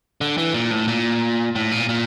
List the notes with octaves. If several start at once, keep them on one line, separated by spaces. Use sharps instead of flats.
D3
E3
A#2
A2
A#2
A2
A#2
A#2